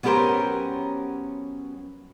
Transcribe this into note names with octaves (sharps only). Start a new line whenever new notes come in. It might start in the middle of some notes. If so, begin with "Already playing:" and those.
F#3 B3 C#4 G4 A#4 C5